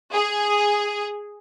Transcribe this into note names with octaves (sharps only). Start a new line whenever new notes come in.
G#4